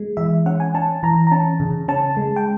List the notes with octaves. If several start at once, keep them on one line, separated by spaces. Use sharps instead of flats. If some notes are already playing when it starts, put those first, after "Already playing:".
Already playing: G#3
E3 E5
C#4 F#5
G#5
C#4 A5
E3 A#5
A#5
C#4 A5
C#3
C#4 A5
G#3
G5